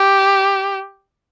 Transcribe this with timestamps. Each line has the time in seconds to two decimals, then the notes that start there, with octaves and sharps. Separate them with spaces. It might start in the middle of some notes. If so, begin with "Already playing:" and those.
Already playing: G4